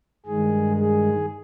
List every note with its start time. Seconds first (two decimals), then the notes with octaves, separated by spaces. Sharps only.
0.26 G2 D#3 G#3 G#4
0.79 G#4